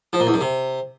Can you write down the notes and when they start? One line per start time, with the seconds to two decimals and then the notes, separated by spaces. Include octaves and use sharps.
0.13 F3
0.20 A#2
0.27 E2
0.34 F#2
0.41 C3